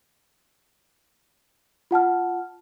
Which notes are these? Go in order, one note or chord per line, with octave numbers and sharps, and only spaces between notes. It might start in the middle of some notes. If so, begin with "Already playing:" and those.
F4 F#5 A5 F6